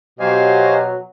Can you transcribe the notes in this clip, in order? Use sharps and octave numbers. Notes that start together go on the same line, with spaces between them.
B2 F#3 G4 C5 D#5 F5 G#5